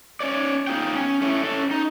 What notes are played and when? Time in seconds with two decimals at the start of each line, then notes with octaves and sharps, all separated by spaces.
0.20 C#4 C#5 D5
0.67 B3 D#4 F4 G#4 G5
0.95 C#4
1.22 A3 C#4 E4
1.43 C#4 A4
1.71 D#4